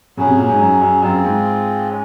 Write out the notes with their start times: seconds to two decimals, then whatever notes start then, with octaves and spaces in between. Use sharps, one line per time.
0.17 C#3 F#3 C#4 G#4
0.27 C3
0.38 A#2
0.49 G#2
0.60 F#2
0.81 F#2
1.02 F#2 C4 F4 G#4
1.24 G#2
1.89 G#3 C#4